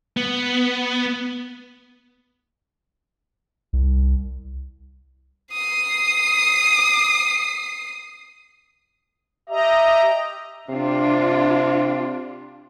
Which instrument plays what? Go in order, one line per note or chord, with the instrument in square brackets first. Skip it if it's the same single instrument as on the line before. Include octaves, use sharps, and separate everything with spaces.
[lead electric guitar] B3
[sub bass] C2
[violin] D#6 C7
[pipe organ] G4 D#5 A#5 [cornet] E5
[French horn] C3 [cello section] D4 F4